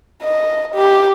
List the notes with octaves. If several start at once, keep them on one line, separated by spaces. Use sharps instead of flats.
D#5
G4